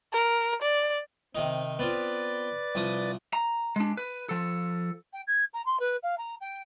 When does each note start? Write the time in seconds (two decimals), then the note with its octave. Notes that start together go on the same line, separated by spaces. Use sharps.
0.13 A#4
0.62 D5
1.35 C3 D#3 C4 D#4
1.79 B3 C4 F4 B4 D5 A6
2.75 C2 F3 D#6
3.33 A#5
3.76 G#3 D4
3.97 B4
4.29 F3 A4
5.13 G5
5.27 G#6
5.53 A#5
5.66 C6
5.80 B4
6.03 F5
6.18 A#5
6.41 G5